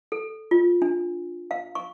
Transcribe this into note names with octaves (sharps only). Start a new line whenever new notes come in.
A4
F4
D4
F5
C#6